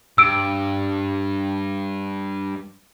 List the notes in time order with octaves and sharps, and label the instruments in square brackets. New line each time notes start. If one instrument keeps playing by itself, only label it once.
[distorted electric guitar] G2 [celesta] E6 D7